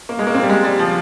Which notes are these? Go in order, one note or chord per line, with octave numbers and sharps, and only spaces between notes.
A#3
G#3
A#3
C4
G3
G#3
G3
F3